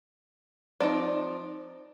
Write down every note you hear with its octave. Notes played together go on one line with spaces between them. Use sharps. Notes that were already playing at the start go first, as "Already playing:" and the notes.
F3 C4 D#4 D5